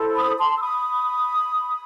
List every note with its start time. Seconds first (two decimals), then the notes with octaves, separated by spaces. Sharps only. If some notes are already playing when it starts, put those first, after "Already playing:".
Already playing: E4 A4 C5
0.15 B5 D#6
0.37 A5 C6
0.56 E6
0.61 B5 D#6